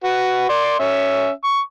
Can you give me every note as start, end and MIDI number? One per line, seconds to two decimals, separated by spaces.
0.04 0.48 66
0.04 0.48 71
0.49 0.79 74
0.49 0.79 84
0.79 1.30 61
0.79 1.30 76
1.44 1.60 85